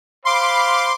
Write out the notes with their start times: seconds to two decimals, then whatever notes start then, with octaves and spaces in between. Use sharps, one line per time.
0.25 C5 F5 B5 C6 D6